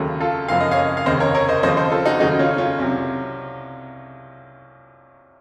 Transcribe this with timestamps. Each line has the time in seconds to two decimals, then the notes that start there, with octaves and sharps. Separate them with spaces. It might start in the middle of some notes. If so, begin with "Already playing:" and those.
Already playing: D#2 C#3 F#3 A3
0.20 F4 A4
0.48 F#1 F#2 F3 F5
0.60 D#5
0.71 C#5 F5
0.97 F5
1.06 F1 D#2 C#3 C5 D#5
1.20 A#4 C#5
1.35 A#4 C#5
1.49 C5 D#5
1.63 D#2 C#3 F3 A3 C5 D#5
1.77 A4 C5
1.92 F4 A4
2.06 D#4 F#4
2.20 D#2 C#3 F#3 A3 D#4 F#4
2.39 C#4 F4
2.58 C#4 F4
2.78 C2 C3 F#3